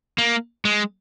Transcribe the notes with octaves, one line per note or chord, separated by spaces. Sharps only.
A#3
G#3